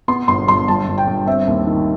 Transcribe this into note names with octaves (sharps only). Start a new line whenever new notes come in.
B3 C6
G1 C6
G2 C6
G1 A5
G1
G5
G2
C4 E5
D#2
D#3